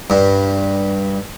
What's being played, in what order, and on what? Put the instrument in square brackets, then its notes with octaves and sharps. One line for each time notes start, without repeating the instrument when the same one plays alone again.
[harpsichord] G2